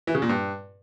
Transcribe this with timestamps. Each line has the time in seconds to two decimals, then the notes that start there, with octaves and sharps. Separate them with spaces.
0.07 E3
0.15 C#3
0.22 A#2
0.29 G2